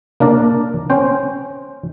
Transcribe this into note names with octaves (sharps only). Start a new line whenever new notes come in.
A#3 D4 A#4 D5
C#4 C5 G5